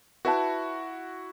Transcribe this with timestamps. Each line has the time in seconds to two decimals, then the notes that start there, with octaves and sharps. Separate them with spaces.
0.25 E4 F#4 B4 E5 A5